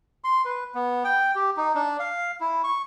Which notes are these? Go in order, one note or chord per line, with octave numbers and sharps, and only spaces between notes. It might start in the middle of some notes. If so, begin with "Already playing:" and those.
C6
B4
B3
G5
G4
D#4
D4
F5
E4
C#6